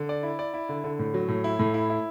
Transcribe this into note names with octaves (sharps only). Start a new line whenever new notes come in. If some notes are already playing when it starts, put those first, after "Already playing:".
Already playing: D3
D5
E4
D5
E4
D3
D3
A2
F#3
A2
E4
A2
E4
E4